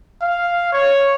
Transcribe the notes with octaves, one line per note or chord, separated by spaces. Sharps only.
F5
C#5